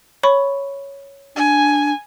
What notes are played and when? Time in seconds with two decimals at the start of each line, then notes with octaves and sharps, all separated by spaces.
0.23 C#5 B5 C#6
1.36 D4 G#5